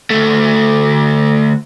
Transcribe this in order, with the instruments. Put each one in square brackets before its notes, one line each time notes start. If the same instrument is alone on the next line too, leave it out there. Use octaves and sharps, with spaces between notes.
[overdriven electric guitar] D2 A3